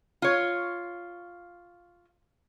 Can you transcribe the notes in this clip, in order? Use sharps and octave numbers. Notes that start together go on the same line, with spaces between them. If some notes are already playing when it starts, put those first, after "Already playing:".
F4 C#5